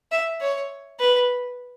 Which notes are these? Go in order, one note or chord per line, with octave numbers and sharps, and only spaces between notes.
E5
C#5
B4